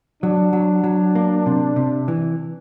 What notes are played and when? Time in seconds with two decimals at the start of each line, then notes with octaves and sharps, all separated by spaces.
0.23 F#3 D4
0.53 F#3
0.84 F#3
1.15 A#3
1.46 C3
1.76 C3
2.08 E3